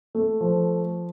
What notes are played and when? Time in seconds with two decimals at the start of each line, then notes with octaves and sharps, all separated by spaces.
0.15 A3
0.41 F3